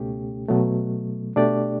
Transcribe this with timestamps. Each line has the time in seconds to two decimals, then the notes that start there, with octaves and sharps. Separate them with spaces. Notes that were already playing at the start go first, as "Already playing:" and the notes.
Already playing: C#2 B2 A3 C#4 G4
0.49 B2 F#3 A3
1.36 B2 A3 D4 G4 D5